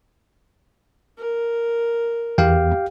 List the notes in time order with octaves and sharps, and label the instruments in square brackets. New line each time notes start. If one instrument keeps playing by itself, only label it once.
[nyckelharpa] A#4
[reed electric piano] E2 [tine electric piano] G4 F5 G5